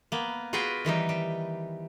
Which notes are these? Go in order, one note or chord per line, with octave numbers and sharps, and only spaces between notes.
A#3 B3
F4 F#4 G#4 B4 F#5 G5
D#3 E3 G3 D#4
G3